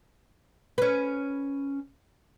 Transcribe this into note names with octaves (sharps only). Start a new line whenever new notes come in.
C#4 B4